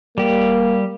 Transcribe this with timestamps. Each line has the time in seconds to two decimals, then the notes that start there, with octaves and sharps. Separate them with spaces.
0.18 G3 A#3 G4